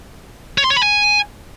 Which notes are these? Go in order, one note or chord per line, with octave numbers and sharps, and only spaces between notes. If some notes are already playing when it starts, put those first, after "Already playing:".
C#5
C6
C#5
B5
G#5